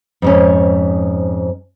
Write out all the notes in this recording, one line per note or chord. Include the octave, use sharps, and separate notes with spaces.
F2 G#2 C#4